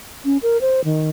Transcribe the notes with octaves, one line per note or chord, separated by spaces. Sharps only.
C#4
A#4
C5
D#3